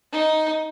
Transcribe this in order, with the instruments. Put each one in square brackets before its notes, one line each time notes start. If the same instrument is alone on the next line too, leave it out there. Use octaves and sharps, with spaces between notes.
[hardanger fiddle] D#4